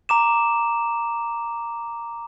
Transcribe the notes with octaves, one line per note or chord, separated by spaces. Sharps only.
A#5 D6 E7